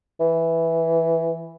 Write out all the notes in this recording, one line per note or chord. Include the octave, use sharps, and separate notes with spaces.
E3